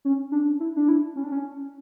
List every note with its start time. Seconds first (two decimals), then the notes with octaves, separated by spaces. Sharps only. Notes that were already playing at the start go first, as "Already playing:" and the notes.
0.05 C#4
0.32 D4
0.60 E4
0.76 D4
0.88 E4
1.16 C#4
1.24 D4
1.32 C#4